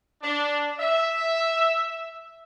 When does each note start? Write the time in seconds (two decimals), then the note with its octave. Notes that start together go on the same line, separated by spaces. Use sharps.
0.22 D4
0.79 E5